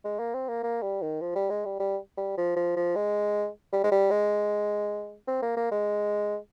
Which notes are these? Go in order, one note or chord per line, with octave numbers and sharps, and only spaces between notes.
G#3
A#3
C4
A#3
A#3
G3
D#3
F3
G3
G#3
G3
G3
G3
F3
F3
F3
G#3
G3
G#3
G3
G#3
C4
A#3
A#3
G#3